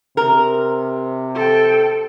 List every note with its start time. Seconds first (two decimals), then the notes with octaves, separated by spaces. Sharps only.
0.17 C3 A#4
1.35 A4 G5